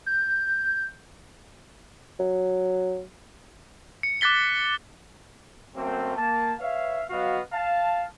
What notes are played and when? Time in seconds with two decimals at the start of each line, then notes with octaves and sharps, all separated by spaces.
0.06 G6
2.20 F#3
4.03 C#7
4.21 D6 F#6 A6 B6 G7
5.76 F#2 A3 A#3 C4
6.17 A#3 A5
6.60 B4 C#5 E5 F5
7.10 F#3 B3 F#4 D#5 F5
7.54 F5 A5